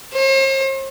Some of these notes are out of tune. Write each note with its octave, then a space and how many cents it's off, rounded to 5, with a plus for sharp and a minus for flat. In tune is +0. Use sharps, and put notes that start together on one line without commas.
C5 +45